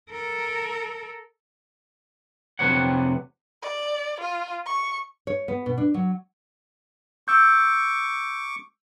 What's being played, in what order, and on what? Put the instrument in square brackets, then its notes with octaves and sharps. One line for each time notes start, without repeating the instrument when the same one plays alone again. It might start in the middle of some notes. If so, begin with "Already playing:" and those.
[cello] A4 A#4
[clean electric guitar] F2 C3 B4 C#5 F#5
[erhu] D5
F4
C#6
[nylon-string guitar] C#5
B3
B2
D4
F#3
[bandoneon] C#6 D6 [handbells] E6 G6